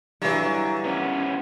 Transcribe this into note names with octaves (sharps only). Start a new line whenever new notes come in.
G2 D3 E3 F#3
B3 C#4